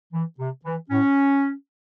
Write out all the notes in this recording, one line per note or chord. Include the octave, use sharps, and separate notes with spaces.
E3
C3
E3
A2 C#4